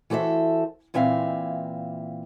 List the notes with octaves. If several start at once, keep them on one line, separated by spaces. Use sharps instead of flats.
E3 F#4 A4 C5 E5
A#2 E3 C4 E5 F5